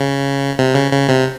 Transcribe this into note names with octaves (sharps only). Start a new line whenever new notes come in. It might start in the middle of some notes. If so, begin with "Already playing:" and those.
Already playing: C#3
C3
C#3
C#3
C3